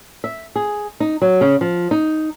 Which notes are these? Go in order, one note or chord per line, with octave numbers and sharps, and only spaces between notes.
E5
G#4
D#4
F#3
C#3
F3
D#4